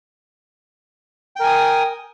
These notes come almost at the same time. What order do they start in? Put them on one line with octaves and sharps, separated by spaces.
G5 A#4 G#5 D#6